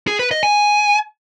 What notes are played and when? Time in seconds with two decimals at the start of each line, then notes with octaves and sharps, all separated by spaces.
0.07 G#4
0.19 B4
0.31 D#5
0.43 G#5